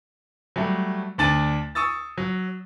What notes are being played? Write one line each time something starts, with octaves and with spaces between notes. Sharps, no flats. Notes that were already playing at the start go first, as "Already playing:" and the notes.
F#3 G3 A3
D2 D4 A6 D#7
C#6 D#6 E6 A6
F#3